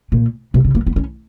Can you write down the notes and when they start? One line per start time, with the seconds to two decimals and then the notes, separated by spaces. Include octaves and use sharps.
0.12 A#2
0.54 B2
0.64 C#3
0.75 A#3
0.87 B3
0.96 C#4